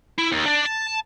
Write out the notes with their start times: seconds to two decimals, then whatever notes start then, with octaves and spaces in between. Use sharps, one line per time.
0.19 E4
0.32 D#2
0.46 D4 D5
0.65 A5